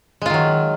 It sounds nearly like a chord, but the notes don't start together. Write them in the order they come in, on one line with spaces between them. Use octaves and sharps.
G#3 F4 D#3 F#3